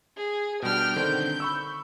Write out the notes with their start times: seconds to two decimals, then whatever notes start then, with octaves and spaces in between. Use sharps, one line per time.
0.17 G#4
0.62 B2 G3 D4 G5 F6
0.96 D3 D#3 C4 G6
1.40 B5 C#6 E6